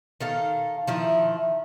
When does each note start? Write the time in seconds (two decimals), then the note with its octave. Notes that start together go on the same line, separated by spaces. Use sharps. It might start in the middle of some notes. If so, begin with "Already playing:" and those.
0.20 D#3 A4 F5
0.87 D#3 F3 E4